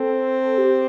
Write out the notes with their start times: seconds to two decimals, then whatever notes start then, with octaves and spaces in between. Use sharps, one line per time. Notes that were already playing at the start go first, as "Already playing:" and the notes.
Already playing: C4 A4
0.58 G4